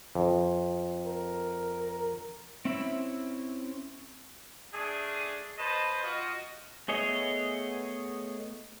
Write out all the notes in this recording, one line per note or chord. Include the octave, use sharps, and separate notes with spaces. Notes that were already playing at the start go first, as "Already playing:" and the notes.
F2
A#4
C4 C#4 E4 E5 B5
A3 D4 G#4
B4 C5 D#5 A5
F4 F#4 D#5
A3 B3 G#4 C#5 D#5